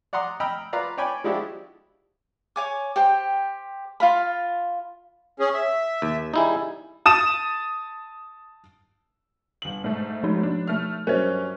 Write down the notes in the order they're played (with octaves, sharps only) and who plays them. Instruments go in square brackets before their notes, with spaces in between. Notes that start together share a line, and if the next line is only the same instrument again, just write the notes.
[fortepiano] D5 F#5 A#5 C6 D#6
D#5 G5 A#5 B5 E6 F6
F4 B4 D5 F5 A#5
C#5 D5 G5 G#5 B5
F3 G#3 D4 E4 F#4 G4
[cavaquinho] C#5 G#5 D6
G4 C5 G5
F4 F5 B5
[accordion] C#4 G#4
E5
[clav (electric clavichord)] D#2
[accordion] G3 [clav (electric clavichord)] D#4 E4 G#4
[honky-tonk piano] A5 D#6 D#7 E7
G1 F#7
G#2 A3
[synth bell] F3 D#4
[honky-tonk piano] D4
A3 F6
[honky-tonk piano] G2 F#3 C#4 [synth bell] A#4 C5